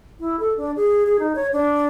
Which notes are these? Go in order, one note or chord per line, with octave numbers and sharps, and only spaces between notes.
E4
A4
D4
G#4
G#4
D#4
C#5
D4